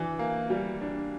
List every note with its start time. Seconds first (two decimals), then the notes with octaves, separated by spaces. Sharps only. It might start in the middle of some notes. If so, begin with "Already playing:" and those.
Already playing: E3 D4
0.19 A#3
0.50 G3
0.81 D4